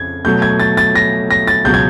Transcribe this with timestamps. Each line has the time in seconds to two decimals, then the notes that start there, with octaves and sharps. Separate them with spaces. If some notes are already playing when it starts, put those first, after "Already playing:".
Already playing: F2 C#3 G#6
0.25 B2 F#3 A3 G6
0.42 G#6
0.60 A6
0.77 A6
0.96 A#6
1.31 A#6
1.47 A6
1.65 C#2 B2 F#3 G6
1.74 G#6